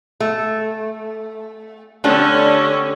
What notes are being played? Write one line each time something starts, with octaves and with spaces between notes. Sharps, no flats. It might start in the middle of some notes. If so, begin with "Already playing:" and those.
A3
D3 A3 C#4 D4 G4